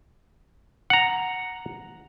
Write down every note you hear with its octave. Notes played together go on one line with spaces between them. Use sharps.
F#5 A#5